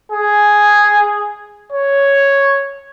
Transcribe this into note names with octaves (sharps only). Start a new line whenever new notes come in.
G#4
C#5